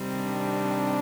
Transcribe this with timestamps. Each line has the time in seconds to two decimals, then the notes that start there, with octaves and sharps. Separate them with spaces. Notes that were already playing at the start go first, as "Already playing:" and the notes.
Already playing: C3 D#3 G3 C4
0.21 D4